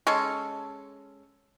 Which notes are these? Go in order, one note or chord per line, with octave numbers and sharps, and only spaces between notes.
G#3 C#4 A4